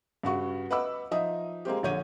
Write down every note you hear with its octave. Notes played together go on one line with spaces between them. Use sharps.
G2 C#3 F#4 C#6
B4 D#5 F#5 B5 D6 E6
F3 D#4 D#5 E5 D#6
G#3 A#3 C4 G4
A#1 D3 C#5 G6 D#7